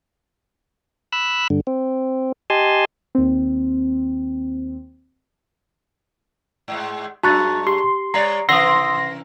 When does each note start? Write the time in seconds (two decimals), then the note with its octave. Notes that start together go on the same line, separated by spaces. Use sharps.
1.12 B5 E6 F#6
1.50 G2 D3
1.67 C4
2.50 G4 D#5 G#5 A5 C6
3.15 D#2 C4
6.68 G#2 G#3
7.23 F#2 G#3 F#4 A5 A#5 C#6 F#6 A6
7.67 G4 C6
8.14 G3 C#5 D5 A#5 C7
8.49 C3 E3 A#4 F#5 C6 D#6 E6 A#6